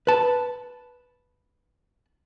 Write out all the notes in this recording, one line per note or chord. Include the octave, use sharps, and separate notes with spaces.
B4 A5